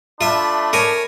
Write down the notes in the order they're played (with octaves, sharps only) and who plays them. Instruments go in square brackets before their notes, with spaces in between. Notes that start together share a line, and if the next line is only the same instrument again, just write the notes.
[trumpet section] A3 D4 B5 [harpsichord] F4 E5
[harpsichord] A#4 C#5 G#5